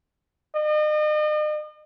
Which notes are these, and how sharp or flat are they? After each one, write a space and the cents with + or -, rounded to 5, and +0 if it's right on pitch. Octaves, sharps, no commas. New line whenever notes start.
D#5 -40